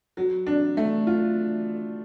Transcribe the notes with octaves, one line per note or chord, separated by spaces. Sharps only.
F#3
D4
A3
F4